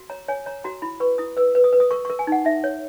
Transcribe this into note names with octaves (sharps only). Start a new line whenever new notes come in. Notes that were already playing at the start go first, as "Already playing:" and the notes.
Already playing: F#4
C#5 A#5
C#5 G#5
C#5 A#5
F#4 A#5
E4 B5
B4 C#6
E4 D#6
B4 E6
B4
D#6
B4
D#6
A#4 C#6
C#6
A#4
G#5
D#4 F#5
D#4 E5
C#5